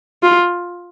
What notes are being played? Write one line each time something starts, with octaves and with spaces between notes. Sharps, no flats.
F4